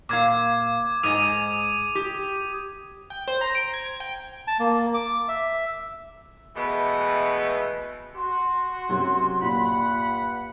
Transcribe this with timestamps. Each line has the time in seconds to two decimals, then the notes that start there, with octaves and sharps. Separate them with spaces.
0.09 A#2 F5 D6 G#6
1.03 G#2 D#5 G#5 D#6 D#7
1.95 G4
3.10 G5
3.28 C5
3.41 A#5
3.55 D7
3.74 G#6
4.00 G5
4.48 A5
4.59 A#3
4.94 D6
5.28 E5
6.56 B2 E3 G#3 A3 B3
8.15 F#4 C6
8.89 F#2 C3 F#3
9.42 G2 A#2 F#5 B5